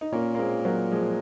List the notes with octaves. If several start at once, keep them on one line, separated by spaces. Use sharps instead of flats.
D#4
A#2 A#3 C#4
A#3
G#3 C4
F#3 A#3
F3 G#3